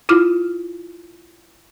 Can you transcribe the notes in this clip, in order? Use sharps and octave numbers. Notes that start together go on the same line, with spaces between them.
E4 F4 D6 F6